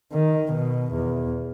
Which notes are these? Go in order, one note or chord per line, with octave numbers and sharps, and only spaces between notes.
D#3
B2
E2